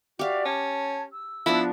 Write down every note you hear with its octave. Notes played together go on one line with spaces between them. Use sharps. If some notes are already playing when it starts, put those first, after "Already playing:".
F#4 G4 D5 E5 F5
C#4 A5 G#6
E6
F3 B3 D4 E4